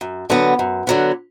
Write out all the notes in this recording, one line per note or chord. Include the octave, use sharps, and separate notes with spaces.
F#2
D3 F#3 B3
F#2
D3 F#3 B3